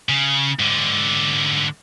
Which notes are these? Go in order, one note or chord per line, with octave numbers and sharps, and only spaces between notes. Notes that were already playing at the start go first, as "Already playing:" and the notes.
C#3
G#2 D3